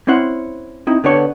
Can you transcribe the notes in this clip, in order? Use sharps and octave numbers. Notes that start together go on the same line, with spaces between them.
C4 C#4 E4 C5 F#5
C4 D#4 E4
D3 B3 D4 G4 C#5